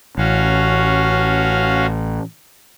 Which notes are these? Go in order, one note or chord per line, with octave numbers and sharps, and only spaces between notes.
A1 C#4 F#4 F5